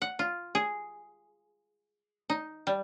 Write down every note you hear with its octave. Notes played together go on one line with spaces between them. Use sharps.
F#5
F4
G#4
D#4
G3